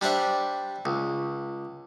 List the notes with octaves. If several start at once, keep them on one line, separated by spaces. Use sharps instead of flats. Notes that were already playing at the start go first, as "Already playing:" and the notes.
G3 D4 C5 E5 F#5
C#2